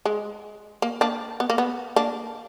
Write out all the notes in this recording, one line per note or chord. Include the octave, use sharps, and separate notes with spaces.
G#3
A#3
A#3 D4
B3
A#3
B3
A#3 D4